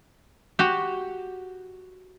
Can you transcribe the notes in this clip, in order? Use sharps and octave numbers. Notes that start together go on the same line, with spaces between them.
F#4 G4